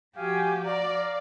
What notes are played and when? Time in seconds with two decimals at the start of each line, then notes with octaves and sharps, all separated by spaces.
0.17 F3 F#4 G4 F5 G#5
0.65 D5 F5 A#5